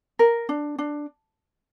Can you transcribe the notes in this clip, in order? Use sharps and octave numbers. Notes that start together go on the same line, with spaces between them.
A#4
D4
D4